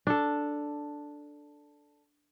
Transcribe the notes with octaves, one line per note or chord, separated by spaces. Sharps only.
D4 A4